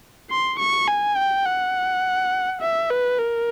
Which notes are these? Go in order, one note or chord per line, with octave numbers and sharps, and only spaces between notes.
C6
C#6
G#5
G5
F#5
E5
B4
A#4